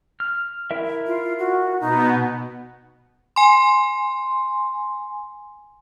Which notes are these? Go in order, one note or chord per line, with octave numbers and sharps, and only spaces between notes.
F6
E4 A#4 E5
F4
F#4
B2 B3 D#4
G#5 C6